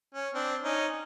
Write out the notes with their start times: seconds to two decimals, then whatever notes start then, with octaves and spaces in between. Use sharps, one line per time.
0.14 C#4
0.34 C4 D4
0.64 C#4 D#4